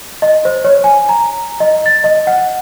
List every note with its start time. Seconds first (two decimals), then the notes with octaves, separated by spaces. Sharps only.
0.22 D#5
0.45 C5
0.64 C#5
0.84 G#5
1.09 A#5
1.60 D#5
1.86 A6
2.04 D#5
2.27 F#5